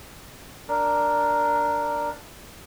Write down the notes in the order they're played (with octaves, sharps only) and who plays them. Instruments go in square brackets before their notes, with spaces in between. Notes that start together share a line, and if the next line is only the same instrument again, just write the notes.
[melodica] D4 A#4